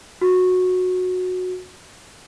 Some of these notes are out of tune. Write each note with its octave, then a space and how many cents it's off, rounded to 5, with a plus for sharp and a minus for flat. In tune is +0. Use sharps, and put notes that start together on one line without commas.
F#4 -15